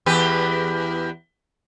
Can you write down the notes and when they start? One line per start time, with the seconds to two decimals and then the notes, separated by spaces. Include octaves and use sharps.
0.06 E2 G4 B4